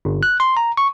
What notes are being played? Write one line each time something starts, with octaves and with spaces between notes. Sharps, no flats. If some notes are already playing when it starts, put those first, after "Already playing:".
G1
F#6
C6
A#5
C#6